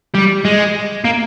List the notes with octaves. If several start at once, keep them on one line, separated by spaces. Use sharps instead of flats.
G3
G#3
A#3